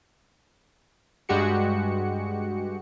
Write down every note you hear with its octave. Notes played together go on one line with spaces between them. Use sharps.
G2 G#3 F#4 G4 C#7